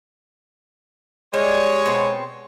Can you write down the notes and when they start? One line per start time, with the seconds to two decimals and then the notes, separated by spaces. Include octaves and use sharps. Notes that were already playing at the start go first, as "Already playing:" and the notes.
1.34 G3 G#3 C#5
1.86 B2 C4